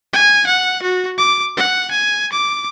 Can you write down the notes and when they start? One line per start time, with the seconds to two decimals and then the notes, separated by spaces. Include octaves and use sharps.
0.13 G#5
0.46 F#5
0.82 F#4
1.18 D6
1.57 F#5
1.91 G#5
2.32 D6